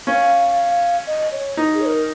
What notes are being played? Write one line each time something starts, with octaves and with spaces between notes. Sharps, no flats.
C#4 F5
D#5
C#5
D#4
G#4
C#5
A#4